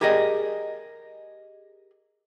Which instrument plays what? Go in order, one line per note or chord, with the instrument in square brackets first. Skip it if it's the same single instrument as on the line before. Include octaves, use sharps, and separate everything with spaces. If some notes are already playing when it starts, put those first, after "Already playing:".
[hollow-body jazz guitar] G4 G#4 A#4 D5 D#5 G5